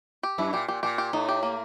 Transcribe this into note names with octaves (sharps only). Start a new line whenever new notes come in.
G4
F#2 E4
A#2 G4
A#2 G4
A#2 G4
G4
A2 D#4
G4
A#3